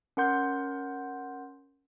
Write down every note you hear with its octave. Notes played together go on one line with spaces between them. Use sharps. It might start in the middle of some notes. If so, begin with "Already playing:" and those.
C#4 A#4 F#5 C6 G6